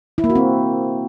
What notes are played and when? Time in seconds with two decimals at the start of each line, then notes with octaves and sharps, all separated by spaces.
0.18 E4
0.24 A#3
0.30 F#4
0.35 C4